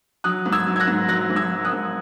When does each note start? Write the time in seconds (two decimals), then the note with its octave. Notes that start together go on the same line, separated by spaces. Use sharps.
0.24 F#3 D#6 F#6
0.46 G#2
0.52 E6 G#6
0.66 F#3
0.76 G#6
0.80 F#6 A#6
0.87 G#2
1.08 F#3 F#6 A#6
1.30 G#2
1.36 E6 G#6
1.51 F#3
1.65 D#6 F#6
1.72 G#2